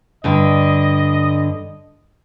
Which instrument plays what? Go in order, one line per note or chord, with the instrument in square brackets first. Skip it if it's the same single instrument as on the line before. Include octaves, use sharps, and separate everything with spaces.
[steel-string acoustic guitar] G2 D3 G5 [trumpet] D#5